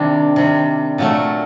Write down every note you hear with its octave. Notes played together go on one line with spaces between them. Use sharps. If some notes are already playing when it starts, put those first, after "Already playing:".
Already playing: C3 D#3 G3 D4
C3 D#3 G3
A#2 F#3 A3